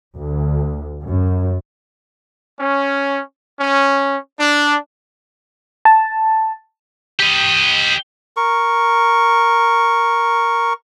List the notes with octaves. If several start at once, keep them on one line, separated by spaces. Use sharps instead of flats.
D2
F#2
C#4
C#4
D4
A5
G4 D#5
A#4 C#6